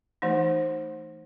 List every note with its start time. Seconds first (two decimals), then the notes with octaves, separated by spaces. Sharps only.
0.22 E3 A3 D#4